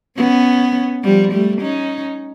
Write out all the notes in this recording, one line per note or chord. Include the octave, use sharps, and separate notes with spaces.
B3 C#4
F3 G3
G3 A3
C#4 D#4